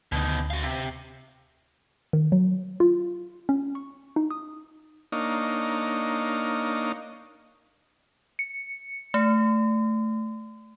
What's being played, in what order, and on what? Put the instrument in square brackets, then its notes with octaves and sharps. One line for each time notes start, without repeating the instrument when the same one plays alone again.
[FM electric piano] D2 [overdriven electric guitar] B2 D#3
[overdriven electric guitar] F#4 F5
C3
[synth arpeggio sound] D#3
F#3
F4
C#4
C#6
D#4
D#6
[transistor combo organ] A#3 D4 D#4 C#5 D#5 F5
[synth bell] C#7
A3